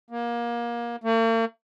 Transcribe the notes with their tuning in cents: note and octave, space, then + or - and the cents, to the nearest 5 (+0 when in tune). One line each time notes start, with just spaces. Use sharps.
A#3 +25
A#3 -45